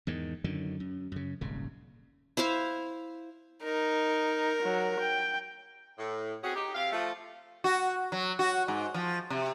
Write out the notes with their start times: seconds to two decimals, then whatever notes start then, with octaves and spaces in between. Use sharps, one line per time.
0.07 E2 G#2 D#3
0.44 F#2 D3 D#3 F#3
0.80 F#2
1.12 F#2 C#3
1.41 D#1 G#1 C#3
2.37 E4 C5 E5 F5
3.63 D#4 A#4
4.63 F#3
5.00 G5
5.98 A2
6.43 C4 C#4 F#4 G#4
6.55 D#4 G4
6.74 C3 G4 F5
6.92 F3 A3
7.64 F#4
8.12 F#3
8.39 F#4
8.68 G#2
8.94 F3
9.30 C3